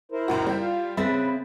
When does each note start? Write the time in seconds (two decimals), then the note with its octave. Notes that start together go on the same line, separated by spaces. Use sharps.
0.12 E4 A#4 C5
0.28 C#2 F#2 F#4
0.47 G3 G4
0.61 F4 F5
0.97 C#3 C4 G#4 B4 E5 B5 A6 B6